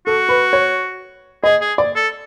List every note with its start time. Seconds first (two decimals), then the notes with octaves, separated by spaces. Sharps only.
0.07 F#4 A4
0.29 B4
0.53 C#5
1.44 G#4 D#5
1.61 G#4
1.78 D5
1.96 A4